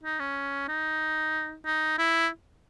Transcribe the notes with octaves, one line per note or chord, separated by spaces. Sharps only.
D#4
C#4
D#4
D#4
E4